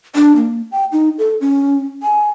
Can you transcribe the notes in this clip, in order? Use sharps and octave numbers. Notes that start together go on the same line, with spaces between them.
D4
A#3
G5
D#4
A4
C#4
G#5